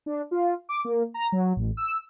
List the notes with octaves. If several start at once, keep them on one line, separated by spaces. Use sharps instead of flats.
D4
F4
D6
A#3
A#5
F#3
A1
E6